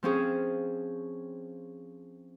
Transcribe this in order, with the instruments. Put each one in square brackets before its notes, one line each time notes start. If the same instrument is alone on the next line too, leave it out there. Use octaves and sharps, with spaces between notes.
[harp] F3 C4 C#4 G#4